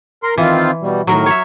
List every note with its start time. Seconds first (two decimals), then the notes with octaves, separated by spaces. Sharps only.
0.23 A#4 C6
0.38 D#3 E3 C4 F4
0.82 B2 G3
1.07 A2 D#3 F#3 A#4
1.26 C#5 E5